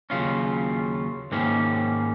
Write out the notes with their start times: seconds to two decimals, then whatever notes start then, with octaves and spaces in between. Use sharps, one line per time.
0.10 D#2 C#3 F#3 C#4 F4
1.32 G#2 D#3 A#3 C#4